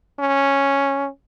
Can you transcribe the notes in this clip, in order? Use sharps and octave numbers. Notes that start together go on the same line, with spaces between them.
C#4